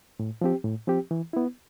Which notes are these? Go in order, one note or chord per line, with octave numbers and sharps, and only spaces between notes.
A2
F3 C4 G4
A2
F3 C4 G4
E3
B3 E4